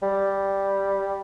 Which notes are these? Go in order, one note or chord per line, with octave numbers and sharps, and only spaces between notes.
G3